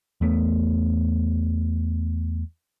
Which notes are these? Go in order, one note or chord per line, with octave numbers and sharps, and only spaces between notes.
E2 A3 B3